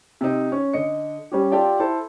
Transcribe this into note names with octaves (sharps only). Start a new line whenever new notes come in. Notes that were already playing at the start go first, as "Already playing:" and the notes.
C3 D#4
C#4
D3 D#5 C#7
G3 C#4 G4
F4 G4 A4 D5 G5 A5
E4 A4 C5